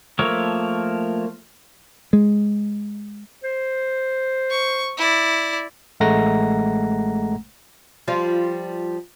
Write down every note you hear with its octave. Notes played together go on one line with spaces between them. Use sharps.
F3 A3 A#3 A#4 C#5
G#3
C5
C#6
E4 D5
A1 G#3 A3 F#5 A#5 A#6
F3 G3 F4